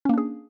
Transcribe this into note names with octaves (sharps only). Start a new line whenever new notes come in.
A#3 C#4 D4 G#4